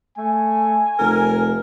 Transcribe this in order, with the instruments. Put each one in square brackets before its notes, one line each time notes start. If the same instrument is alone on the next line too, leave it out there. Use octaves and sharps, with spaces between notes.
[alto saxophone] A3 [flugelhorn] G#5
[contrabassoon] F1 [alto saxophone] A#4